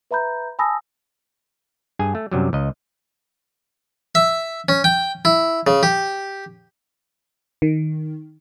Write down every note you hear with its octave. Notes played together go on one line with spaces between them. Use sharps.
B4 E5 A#5 B5 G6
G#5 A5 B5 D#6 E6 A#6
G2 G#4 G#5
A3
F#2 C3 F#3 G3
C#2 D#5
E5
C#4
G5
E4
C#3
G4
D#3